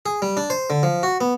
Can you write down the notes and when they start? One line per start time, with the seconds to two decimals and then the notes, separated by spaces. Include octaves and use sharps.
0.06 G#4
0.22 G3
0.37 D4
0.50 C5
0.70 D3
0.83 F3
1.03 F#4
1.21 B3